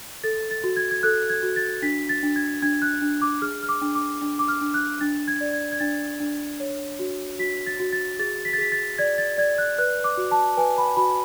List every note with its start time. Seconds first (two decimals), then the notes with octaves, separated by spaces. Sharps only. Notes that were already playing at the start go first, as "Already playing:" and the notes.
0.24 A4 A6
0.51 A6
0.64 F#4
0.76 G#6
0.91 G#6
1.03 A4 F#6
1.30 G#6
1.43 F#4
1.56 A6
1.82 D4 B6
2.09 A6
2.23 D4
2.36 G#6
2.62 D4 G#6
2.82 F#6
3.02 D4
3.22 D6
3.42 G#4 F6
3.63 F6
3.69 D6
3.82 D4
3.95 D6
4.22 D4
4.39 D6
4.48 F6
4.61 D4
4.74 F#6
5.01 D4 A6
5.28 G#6
5.41 D5
5.53 G#6
5.72 G#6
5.80 D4 A6
6.20 D4
6.60 C#5
6.99 F#4
7.39 F#4 B6
7.67 A6
7.80 F#4
7.93 A6
8.19 G#4 A6
8.45 B6
8.53 A6
8.58 G#4 B6
8.72 A6
8.98 D5 G#6
9.18 A6
9.38 D5 G#6
9.58 F#6
9.78 B4 F#6
10.04 D6
10.17 F#4
10.31 A5
10.57 B4 G#5
10.78 B5
10.97 F#4 B5